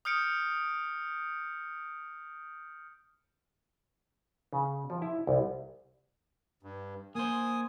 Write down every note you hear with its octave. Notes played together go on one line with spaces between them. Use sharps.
D#6 F6 G6 C#7 D7
C#3
F3
E4
C2
G2
A#3 C5 G#5 D#6